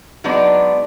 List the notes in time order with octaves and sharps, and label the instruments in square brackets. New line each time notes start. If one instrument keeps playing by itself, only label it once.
[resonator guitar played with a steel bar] F#3 G#3 B3 D4 D#4 D5